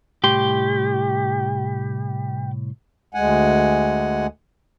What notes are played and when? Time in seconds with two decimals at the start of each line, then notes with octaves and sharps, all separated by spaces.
0.24 C2 A2 G4 C6
3.15 D2 G#3 F#5 G#5